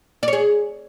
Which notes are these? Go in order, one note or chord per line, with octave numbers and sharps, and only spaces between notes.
D5
C#5
G#4